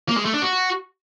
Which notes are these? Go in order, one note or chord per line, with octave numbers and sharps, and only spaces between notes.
A#3
G#3
A3
D4
F#4